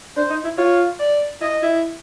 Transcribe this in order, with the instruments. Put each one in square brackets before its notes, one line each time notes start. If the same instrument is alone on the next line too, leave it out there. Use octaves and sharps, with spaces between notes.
[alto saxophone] D4 [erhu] C5
[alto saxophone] D#4
E4
[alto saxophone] F4 [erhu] C#5
[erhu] D5
[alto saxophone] E4 [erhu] D#5
[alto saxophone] E4